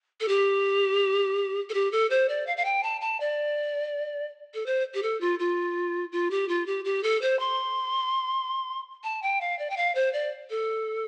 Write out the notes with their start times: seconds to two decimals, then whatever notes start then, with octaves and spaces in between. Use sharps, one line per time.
0.20 A4
0.28 G4
1.69 A4
1.74 G4
1.92 A4
2.10 C5
2.29 D5
2.47 F5
2.57 F5
2.65 G5
2.83 A5
3.01 A5
3.20 D5
4.54 A4
4.66 C5
4.94 G4
5.02 A4
5.21 F4
5.39 F4
6.12 F4
6.31 G4
6.48 F4
6.66 G4
6.85 G4
7.03 A4
7.22 C5
7.39 C6
9.04 A5
9.22 G5
9.41 F5
9.59 D5
9.70 G5
9.77 F5
9.95 C5
10.13 D5
10.50 A4